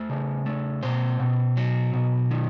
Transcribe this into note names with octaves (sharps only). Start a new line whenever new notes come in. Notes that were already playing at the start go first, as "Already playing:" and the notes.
Already playing: A3 C5
C#3
A3
B2 C5
B2
F#3
B2
D#3